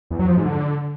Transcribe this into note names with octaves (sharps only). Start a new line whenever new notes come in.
E2
F#3
F3
G#2
D3